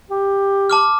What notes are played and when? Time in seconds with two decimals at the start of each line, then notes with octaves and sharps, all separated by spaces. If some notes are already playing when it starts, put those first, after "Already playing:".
0.10 G4
0.70 A5 D6 F6